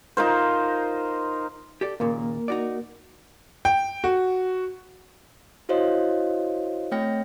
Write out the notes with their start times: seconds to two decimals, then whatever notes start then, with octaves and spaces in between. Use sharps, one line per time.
0.17 D#4 F4 A#4 C5
1.81 G4 A4 D5
2.00 D#2 A#2 C#3 A#3 A#4
2.48 D#4 F#4 D5
3.65 G5
4.04 F#4
5.69 E4 F#4 C5 C#5 D#5 F5
6.92 A3 C4 C#5 G5 F6 A#6